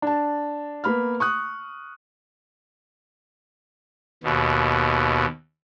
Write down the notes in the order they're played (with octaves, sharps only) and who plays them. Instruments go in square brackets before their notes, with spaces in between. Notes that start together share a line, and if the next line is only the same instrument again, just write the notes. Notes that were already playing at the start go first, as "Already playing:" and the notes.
[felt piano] D4 A5
A#3 B3 B5 F6
C#6 D#6 F#6
[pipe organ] D#2 B2